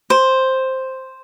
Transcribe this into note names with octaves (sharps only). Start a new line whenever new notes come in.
C5